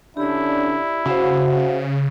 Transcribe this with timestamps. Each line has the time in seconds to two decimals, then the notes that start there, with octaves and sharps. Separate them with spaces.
0.17 D3 C#4 D4 E4 G4 D5
1.05 C#3 F#4 C5 E5 F5